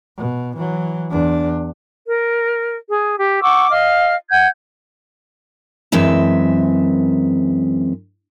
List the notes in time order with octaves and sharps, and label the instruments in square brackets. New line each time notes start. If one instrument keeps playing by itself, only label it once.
[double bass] B2
E3 F#3
E2 D4
[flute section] A#4
G#4
G4
F#5 C#6 D6 E6
D#5 F5 F6
F#5 G6 G#6
[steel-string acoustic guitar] F#2 E3 G#3 C4 E5